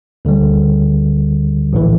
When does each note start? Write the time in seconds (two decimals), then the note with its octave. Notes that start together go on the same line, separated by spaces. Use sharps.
0.25 D2 D3 G3
1.73 A#1 A2 E3